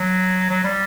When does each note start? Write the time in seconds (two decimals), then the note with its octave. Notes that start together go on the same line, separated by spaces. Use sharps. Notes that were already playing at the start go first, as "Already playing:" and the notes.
Already playing: F#3
0.50 F#3
0.64 G3